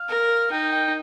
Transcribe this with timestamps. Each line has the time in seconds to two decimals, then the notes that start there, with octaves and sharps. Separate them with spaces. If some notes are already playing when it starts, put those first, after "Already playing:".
Already playing: F5
0.09 A#4
0.51 D#4 G5
0.72 G5